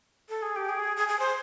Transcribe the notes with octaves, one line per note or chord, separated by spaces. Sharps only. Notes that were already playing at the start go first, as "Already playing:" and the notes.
A4
G#4
G4
G#4
G#4
G#4
C5